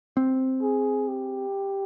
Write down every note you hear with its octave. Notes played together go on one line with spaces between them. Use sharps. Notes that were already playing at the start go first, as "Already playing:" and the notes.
C4
G#4
G4